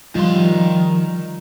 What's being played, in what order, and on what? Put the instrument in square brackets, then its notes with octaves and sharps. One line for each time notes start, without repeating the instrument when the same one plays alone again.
[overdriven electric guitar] D#3 C6 [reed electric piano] F3 [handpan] G3 F4